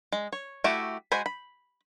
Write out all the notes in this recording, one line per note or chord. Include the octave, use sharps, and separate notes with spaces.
G#3
C#5
A3 E4 F#4 G4
G#3 F#4 C5 G#5 B5
B5